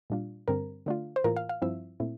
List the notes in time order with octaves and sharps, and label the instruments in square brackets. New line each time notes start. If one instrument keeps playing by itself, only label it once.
[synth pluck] A#2 G3 D4 F4
G2 D3 G3 C4 A#4
D3 A3 D4 F4
C5
A2 E3 A#3 F4 A#4
F5
F5
G2 F3 C4 E4 E5
A#2 A3 C4 E4